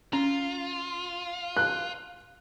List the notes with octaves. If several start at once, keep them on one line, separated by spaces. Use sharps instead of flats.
C#4 F4
F#6